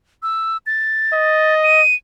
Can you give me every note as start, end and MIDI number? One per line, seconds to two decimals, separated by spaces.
0.23 0.57 88
0.66 1.55 93
1.13 1.82 75
1.63 1.95 99